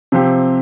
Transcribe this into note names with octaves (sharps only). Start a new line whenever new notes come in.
C3 F3 C4 G4